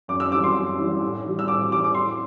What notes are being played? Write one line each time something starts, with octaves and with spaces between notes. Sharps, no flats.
F#2 D6
E6
E3 G3 D6
C6
F#2
E3 G3
A2
E3 G3
E6
A2 D6
E3 G3 D6
D6
A2 C6